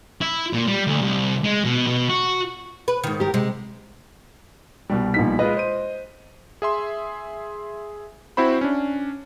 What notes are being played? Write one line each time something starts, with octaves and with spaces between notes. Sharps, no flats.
E4
A#2
G3
D2
C2
G#3
B2
B2
F#4
B4
G#2 D#3
G4 A#4
C3 G#3
C2 B2 G3
A#1 D#4 B6
G#3 F4 B4 D#5
C5 D#7
G#4 E5 C6
C4 E4 F#4 C5 B5
C#4 D4